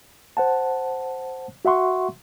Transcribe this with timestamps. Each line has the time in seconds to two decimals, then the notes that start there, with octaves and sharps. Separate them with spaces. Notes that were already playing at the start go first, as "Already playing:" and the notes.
0.37 C5 F#5 A5
1.65 F#4 E5 F#5 C6 C#6